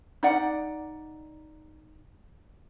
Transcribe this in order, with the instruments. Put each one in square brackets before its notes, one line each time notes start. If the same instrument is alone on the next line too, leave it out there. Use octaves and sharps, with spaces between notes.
[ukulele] D#4 D5 F#5